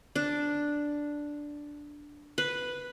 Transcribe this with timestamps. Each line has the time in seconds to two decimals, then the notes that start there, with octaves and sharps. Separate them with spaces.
0.16 D4
2.38 B4